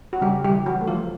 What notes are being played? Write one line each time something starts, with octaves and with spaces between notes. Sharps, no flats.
F#4
C#3 G3 G4
G3 G4
E3
F#3 F#4
A3
F3 F4